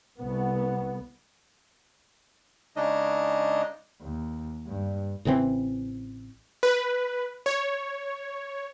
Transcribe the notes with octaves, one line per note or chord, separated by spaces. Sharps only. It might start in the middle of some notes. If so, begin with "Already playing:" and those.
C2 B3
C#3 G#3 D4 D#4 D#5
D#2
G2
A1 C#3 E3 C4
B4
C#5